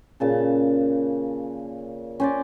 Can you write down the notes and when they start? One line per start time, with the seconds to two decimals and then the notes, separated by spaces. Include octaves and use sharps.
0.20 A#2 C#3 A5
2.20 C#4 C5 D5